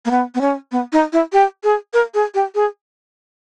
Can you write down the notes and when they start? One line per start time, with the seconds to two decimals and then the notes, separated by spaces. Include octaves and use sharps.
0.05 A#3
0.11 B3
0.35 B3
0.41 C#4
0.72 B3
0.92 D#4
1.13 E4
1.33 G4
1.64 G#4
1.94 A#4
2.14 G#4
2.34 G4
2.55 G#4